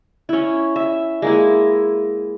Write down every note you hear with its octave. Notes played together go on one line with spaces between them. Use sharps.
C#4 E4
E5
G#3 A#3 E4